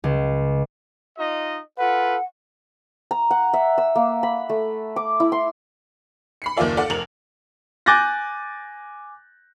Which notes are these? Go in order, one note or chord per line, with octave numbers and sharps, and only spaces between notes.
C#2
D#4 F4 D#5
F4 A4 B4 F#5
A#5
F#5
E5
E6
A#3
B5
A3
D6
E4
C6
B5 C7 C#7
F#1 D#2 A#3 F4 D5 E5
A4 D5 F5 F#5
F1 A#4 F7 F#7
G#5 D6 F#6 G6 A6 A#6